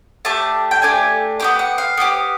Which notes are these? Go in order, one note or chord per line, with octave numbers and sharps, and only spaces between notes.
A3 D4 G4 A5
G5
A3 D4 G4 G#5
B3 D4 G4 G5
F#5
F5
B3 D4 G4